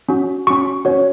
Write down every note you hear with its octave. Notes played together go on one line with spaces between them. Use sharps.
C#4 F#4
C#4 F#4 C#6
C#4 F#4 C#5